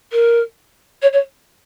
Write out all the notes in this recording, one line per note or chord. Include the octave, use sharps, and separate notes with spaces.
A#4
C#5
C#5